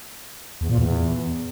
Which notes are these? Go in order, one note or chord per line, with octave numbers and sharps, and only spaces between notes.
E2
A#2
E2